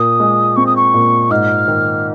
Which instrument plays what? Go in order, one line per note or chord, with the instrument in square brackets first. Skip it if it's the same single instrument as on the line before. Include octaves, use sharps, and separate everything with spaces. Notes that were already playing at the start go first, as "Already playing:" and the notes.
Already playing: [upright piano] A#2 [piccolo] D#6
[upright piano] G#3
[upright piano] C4 [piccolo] C#6
[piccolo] D#6
C#6
[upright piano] A#2
[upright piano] G#2 [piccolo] F6
[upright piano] D#3